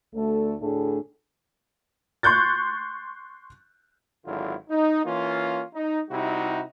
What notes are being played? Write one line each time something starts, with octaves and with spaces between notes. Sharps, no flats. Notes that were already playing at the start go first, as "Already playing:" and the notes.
D2 A3 A4
D2 A2 A3 D4 G#4
C6 C#6 F#6 G6 A6
G#1 D3 F#3 E4 F4
D#4
E3 A#3 C#4 F4
D#4
C3 G3 D#4 E4 F#4